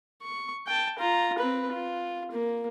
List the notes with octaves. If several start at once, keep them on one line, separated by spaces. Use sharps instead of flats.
C#6
G5 A5
F4 A#5
C4 B4
F4
A#3